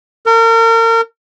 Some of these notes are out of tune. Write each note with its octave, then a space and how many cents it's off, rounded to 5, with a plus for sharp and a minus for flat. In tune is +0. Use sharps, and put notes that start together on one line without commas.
A#4 -35